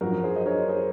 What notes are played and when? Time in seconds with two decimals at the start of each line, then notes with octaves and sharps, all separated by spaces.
0.01 F#2 F3 F#4 A#4
0.24 G#4 C5
0.36 D#5
0.46 A#4 C#5
0.69 G#4 C5